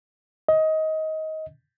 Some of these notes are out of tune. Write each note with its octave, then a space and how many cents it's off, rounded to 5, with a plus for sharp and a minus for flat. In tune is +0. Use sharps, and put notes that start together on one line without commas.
D#5 +20